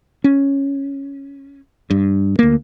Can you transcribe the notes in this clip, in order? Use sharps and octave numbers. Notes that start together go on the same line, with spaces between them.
C#4
G2
D2 A#3